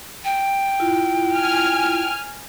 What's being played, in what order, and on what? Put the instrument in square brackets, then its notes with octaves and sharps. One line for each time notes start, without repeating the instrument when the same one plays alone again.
[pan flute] G5
[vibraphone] E4 F4
[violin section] G#5 F6